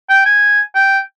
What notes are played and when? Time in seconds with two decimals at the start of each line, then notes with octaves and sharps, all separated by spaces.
0.10 G5
0.26 G#5
0.75 G5